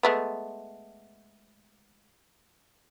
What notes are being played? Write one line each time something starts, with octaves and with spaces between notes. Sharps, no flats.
G#3 A3 B3